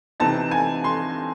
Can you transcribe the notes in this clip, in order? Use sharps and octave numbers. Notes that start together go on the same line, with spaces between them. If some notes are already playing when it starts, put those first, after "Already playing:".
C3 E3 C4 D#4 A5
G#5
C6